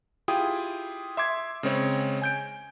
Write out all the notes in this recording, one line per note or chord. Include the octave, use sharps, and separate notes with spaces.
E4 F4 G4 G#4 G5 D#6
E5 C6 D6 G#6
C#3 G#3 C4 C#5
G#5 G6 D7